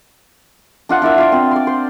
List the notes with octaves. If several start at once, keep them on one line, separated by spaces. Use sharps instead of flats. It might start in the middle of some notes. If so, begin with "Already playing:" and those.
D4 F4 F#5
D4 E4 A#4 E5
F4 D5
C4 F4
D5 C6
C5